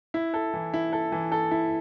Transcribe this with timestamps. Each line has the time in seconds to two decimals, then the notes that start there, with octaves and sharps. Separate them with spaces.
0.14 E4
0.34 A4
0.54 E3
0.74 E4
0.93 A4
1.12 E3
1.32 A4
1.51 E4